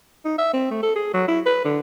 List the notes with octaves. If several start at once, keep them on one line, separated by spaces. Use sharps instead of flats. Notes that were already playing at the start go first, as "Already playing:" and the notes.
D#4
E5
C4
A3
A4
G#4
F#3
E4
B4
D3